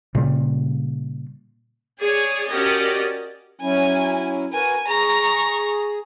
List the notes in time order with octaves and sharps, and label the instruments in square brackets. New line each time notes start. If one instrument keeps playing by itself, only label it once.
[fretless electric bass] A#2 C#3 G3
[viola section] G#4 C#5 D5 G#5
C#4 F#4 G4 A#4 D5 D#5
[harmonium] F#3 C#4 E4 [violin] G#5
[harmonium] F#4 A#4 B4 [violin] G#5
[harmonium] G#4 [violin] A#5 C#6